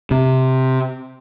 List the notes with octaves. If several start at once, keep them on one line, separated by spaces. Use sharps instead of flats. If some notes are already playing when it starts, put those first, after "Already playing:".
C3